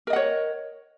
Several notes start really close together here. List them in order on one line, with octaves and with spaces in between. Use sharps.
A#4 D#5 F#5 C#5